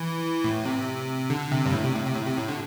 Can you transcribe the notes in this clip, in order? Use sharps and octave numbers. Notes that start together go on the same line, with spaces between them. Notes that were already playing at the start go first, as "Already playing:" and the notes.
Already playing: E3
A2
C3
D3
C3
G2
A2
C3
A2
C3
A2
C3
A2
D3